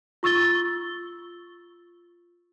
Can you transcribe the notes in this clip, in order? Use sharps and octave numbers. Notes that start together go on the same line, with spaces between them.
F4 C#6 E6 A6 G7